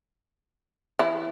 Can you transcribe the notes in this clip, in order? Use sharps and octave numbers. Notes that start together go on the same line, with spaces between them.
E3 E4